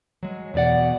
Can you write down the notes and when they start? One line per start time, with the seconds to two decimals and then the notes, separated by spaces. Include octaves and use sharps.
0.23 F#3 G#3
0.54 E2 B2 D5 F#5